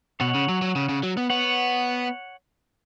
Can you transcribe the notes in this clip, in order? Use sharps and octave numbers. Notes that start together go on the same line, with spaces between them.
B2 C#5 F#5
C#3
F#3
F#3
C#3
C#3
F#3
B3
B3 C#5 F#5